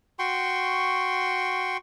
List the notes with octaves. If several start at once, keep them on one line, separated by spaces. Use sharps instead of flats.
F#4 G5 C6 C#6